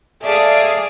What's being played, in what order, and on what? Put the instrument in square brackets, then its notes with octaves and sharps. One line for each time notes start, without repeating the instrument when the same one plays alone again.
[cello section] G#4 D5 F5 [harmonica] A4 E5